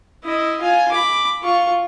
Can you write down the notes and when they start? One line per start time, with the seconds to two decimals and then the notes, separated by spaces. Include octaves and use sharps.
0.24 E4 D#5
0.60 F4 G#5
0.91 B5 D6
1.42 F4 C#6